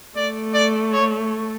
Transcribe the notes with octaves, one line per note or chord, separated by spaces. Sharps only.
A3 D5
D5
C#5